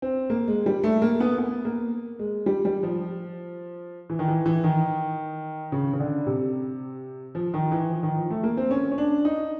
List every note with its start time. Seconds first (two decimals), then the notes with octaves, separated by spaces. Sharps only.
0.02 C4
0.30 A#3
0.48 G#3
0.66 G3
0.83 A3
1.02 A#3
1.20 B3
1.38 B3
1.65 A#3
2.19 G#3
2.46 G3
2.65 G3
2.83 F3
4.10 E3
4.19 D#3
4.28 E3
4.46 E3
4.64 D#3
5.72 C#3
5.93 C#3
6.00 D3
6.26 C3
7.35 F3
7.54 D#3
7.71 E3
7.90 F3
8.03 D#3
8.17 F3
8.30 A3
8.44 A#3
8.57 C4
8.71 C#4
8.92 C#4
8.98 D4
9.25 D#4